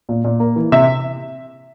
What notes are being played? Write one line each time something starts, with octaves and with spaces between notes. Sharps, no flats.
A#2
A#2
A#3
E3
C3 E5